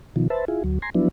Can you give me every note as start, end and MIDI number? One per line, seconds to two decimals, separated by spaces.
0.16 0.28 47
0.16 0.28 51
0.16 0.28 53
0.30 0.45 71
0.30 0.45 72
0.30 0.45 76
0.30 0.45 81
0.48 0.63 64
0.48 0.63 65
0.48 0.63 68
0.64 0.79 38
0.64 0.79 54
0.82 0.90 80
0.82 0.90 82
0.82 0.90 84
0.95 1.08 53
0.95 1.08 54
0.95 1.08 59
0.95 1.08 62
0.95 1.08 64